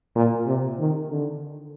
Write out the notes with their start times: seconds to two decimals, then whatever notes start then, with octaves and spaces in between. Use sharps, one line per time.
0.16 A#2
0.47 C3
0.79 D#3
1.10 D3